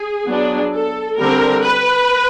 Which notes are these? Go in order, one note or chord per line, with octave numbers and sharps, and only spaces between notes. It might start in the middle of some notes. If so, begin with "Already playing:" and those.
Already playing: G#4
F#3 B3 D4
A4
D3 G3 C4 A#4
B4